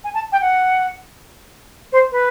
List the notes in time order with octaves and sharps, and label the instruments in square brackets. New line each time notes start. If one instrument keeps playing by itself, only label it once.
[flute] G#5
A5
G5
F#5
C5
B4